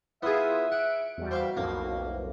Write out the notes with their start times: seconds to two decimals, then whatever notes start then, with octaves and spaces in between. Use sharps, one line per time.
0.23 B3 E4 F4 G#4 E5 D#6
0.72 F#5 D7
1.18 E2 G3 F#4
1.31 C5 E5 F5
1.57 B1 F2 A2 A#3